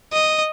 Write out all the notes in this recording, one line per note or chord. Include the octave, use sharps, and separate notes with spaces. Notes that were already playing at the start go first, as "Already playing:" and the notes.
D#5